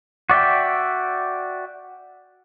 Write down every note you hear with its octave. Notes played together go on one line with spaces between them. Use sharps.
F#4 D5 E5 G5